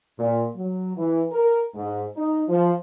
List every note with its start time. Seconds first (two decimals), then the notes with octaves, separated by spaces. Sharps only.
0.19 A#2
0.55 F#3
0.97 E3
1.32 A#4
1.75 G#2
2.17 D#4
2.49 F3